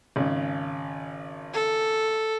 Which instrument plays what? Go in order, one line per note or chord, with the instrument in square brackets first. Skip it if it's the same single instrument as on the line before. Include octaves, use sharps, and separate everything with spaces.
[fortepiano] G#1 C#3
[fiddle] A4